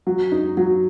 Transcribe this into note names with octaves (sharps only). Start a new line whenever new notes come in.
F#3
D#4
F#3